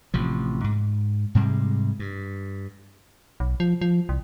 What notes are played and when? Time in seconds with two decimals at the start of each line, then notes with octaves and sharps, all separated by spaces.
0.14 A1 C3 F3
0.64 G#2
1.35 G#2 C3 G3 G#3
1.99 G2
3.40 B1
3.60 F3
3.81 F3
4.09 C2